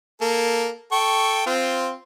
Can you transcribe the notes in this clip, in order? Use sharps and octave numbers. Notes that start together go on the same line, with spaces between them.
A#3 A4
A4 G5 C#6
C4 F4